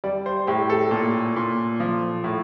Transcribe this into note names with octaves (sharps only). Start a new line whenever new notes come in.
G3 D5
C5
A2 G4
A4
A#2
A#2
F3
A2